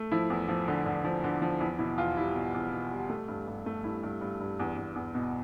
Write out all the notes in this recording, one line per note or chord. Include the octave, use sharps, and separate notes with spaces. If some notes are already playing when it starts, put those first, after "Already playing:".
Already playing: A3
F3 E4
E2
F3
D3
D3
F3
D3
F3
E2 E4
B2 E4
E2 F4
G3 E4
B2
E2
B2
G3
A3
G2
G2
A3
G2 E4
G2
G2
G2
E2
E2
E2
B2